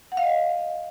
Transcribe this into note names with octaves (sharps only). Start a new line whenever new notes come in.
F#5
F5
D#5